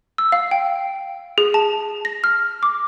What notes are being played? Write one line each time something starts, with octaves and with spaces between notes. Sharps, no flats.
E6
F5
G5
G#4
A5
A#6
F6
D6